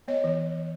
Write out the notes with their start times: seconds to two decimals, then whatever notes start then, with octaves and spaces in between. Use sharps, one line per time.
0.08 B3 C#5 D#5
0.24 E3